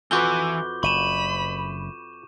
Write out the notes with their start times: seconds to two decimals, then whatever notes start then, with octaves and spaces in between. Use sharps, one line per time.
0.11 F2 E3 F#4 B4 D6 G6 G7
0.83 F#1 B5 C#6 D#7 E7